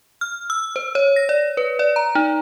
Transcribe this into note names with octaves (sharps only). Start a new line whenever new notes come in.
F6
E6
C5
C#5
A#6
D5
B4
D5
A#5
D#4